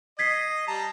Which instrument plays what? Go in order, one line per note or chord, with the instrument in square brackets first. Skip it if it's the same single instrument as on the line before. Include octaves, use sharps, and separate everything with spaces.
[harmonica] D#5 [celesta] G#6 B6 C7
[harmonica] G3 A5 A#5